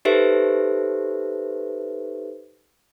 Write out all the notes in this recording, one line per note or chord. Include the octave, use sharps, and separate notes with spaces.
D#4 G4 A4 B4 C5 E5